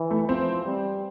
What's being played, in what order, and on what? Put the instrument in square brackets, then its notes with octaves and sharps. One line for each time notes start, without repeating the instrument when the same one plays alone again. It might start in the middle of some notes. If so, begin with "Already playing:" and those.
Already playing: [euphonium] E3
[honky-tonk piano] A3
[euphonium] F3 [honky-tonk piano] C4
[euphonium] G3